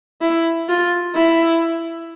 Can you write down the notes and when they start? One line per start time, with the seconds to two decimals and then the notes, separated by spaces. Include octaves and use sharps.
0.21 E4
0.68 F4
1.15 E4